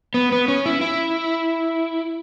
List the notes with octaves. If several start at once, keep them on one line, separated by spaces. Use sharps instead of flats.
B3
B3
C#4
E4
E4